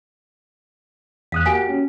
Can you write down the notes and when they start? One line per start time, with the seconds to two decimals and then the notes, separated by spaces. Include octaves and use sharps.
1.32 E2 F5 D#6 F#6
1.46 A#3 F#4 G4 F5 G#5
1.69 C#4